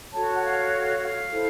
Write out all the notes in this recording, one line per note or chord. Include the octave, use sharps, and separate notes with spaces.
F#4 A4 C#5 A5
F#5
F5
F5
E4 A4 C5